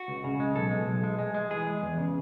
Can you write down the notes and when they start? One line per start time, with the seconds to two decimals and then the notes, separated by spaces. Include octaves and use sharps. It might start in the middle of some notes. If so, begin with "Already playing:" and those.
Already playing: F#4
0.08 C#2
0.24 C#3
0.40 G#3
0.55 B1 A4
0.71 G#3
0.87 B1
1.03 G#3
1.19 G#3
1.34 G#3
1.50 E3 G#4
1.66 G#3
1.82 E2
1.98 C#3